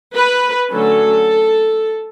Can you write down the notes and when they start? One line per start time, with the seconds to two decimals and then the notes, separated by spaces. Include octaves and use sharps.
0.16 B4
0.72 D3 F#3 A3 C#4 A4